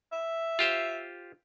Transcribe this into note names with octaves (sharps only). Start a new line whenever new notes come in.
E5
F4 G4 C5